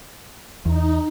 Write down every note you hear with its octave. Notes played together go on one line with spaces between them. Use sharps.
E2 D#4